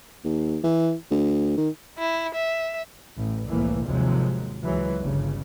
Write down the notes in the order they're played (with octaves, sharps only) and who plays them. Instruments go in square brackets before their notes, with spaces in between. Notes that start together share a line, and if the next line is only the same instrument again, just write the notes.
[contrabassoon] D#2
E3
D2
D#3
[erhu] E4
E5
[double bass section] A1
F1 C2 A2 E3 A#3
G#1 D#2 C3 F3 F#3 G#3
C#2 E3 F#3 G#3
G1 C#3